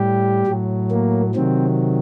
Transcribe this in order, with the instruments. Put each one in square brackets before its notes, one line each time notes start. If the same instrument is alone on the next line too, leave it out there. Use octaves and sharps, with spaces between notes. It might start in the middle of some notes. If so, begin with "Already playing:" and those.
Already playing: [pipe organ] A2 G3 G4
A2 F#3
A#3
C3 D#3 F#3 C4